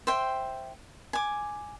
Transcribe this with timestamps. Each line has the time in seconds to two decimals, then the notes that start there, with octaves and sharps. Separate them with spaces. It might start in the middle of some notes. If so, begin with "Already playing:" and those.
0.07 C5 E5 G5
1.13 G#5 D6